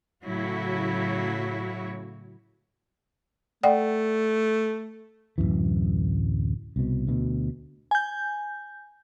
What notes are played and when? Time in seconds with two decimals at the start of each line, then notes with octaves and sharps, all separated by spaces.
0.24 A2 C#3 F#3 E4 F#4 C#5
3.63 A3 D5 F#5 G5
5.38 D1 A#1 F#2 E3
6.76 C2 B2
7.07 D2 B2
7.91 G#5 G6